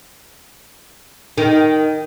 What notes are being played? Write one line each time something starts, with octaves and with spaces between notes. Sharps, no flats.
D#3